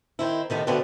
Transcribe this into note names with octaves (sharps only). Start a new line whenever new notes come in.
D#3 C4 E4
C3 D#3 A3 B3
B2 D3 A3 B3 C4